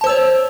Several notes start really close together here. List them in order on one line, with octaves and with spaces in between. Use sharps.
A5 C5 E6 C#5